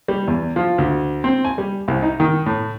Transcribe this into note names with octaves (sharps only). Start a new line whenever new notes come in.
G3
E2
F3
D2
C4
G#5
G3
C2
D#4
D#3
A2